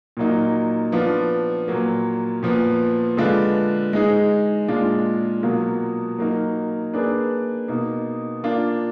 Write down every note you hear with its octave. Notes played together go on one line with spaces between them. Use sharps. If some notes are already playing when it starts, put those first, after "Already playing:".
A#2 F#3 A#3 D#4
F3 B3 D4 F4
A#2 F#3 A#3
A#2 F3 B3
D3 G#3 D4 F4 B4
G#3 D#4 G#4
A#2 G#3 D4 F4
B2 F#3 A#3 F4
F#3 A#3 D#4 A#4
A#3 D4 G#4 B4 D5
B2 A#3 D#4
A#3 D4 F4